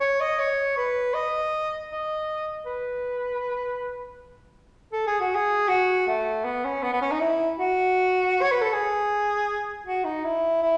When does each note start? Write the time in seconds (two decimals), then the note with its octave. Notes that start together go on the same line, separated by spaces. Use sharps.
0.01 C#5
0.20 D#5
0.39 C#5
0.77 B4
1.14 D#5
1.90 D#5
2.66 B4
4.93 A4
5.07 G#4
5.20 F#4
5.35 G#4
5.68 F#4
6.07 A3
6.45 B3
6.64 C#4
6.82 B3
6.93 B3
7.01 C#4
7.11 D#4
7.20 E4
7.59 F#4
8.41 C#5
8.51 B4
8.61 A4
8.73 G#4
9.86 F#4
10.04 D#4
10.24 E4
10.62 E4